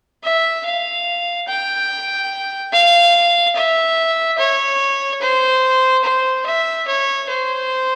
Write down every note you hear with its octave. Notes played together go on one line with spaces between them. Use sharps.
E5
F5
G5
F5
E5
C#5
C5
C5
E5
C#5
C5